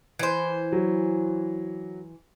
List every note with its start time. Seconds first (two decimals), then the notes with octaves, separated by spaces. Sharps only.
0.19 E3 C5
0.72 F#3